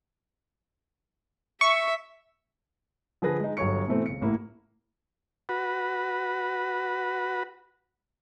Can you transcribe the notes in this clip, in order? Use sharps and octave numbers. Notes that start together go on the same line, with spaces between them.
E5 C#6
D3 F3 G#4 B4 A#6
G#3 D#4
G1 F#3 A4 C#5 C#6 C#7
B2 E3 A3 C4 A4
C#2 C#7
A1 A2 A#3 E4
F#4 B4